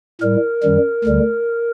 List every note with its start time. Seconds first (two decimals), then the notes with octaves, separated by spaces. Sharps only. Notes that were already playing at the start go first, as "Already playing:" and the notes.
0.21 A2 G3 A#4
0.63 F#2 D#3 G3
1.05 D2 D3 G3